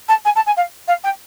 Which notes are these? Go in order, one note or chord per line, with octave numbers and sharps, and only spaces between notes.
A5
G#5
A5
G#5
F5
F5
G5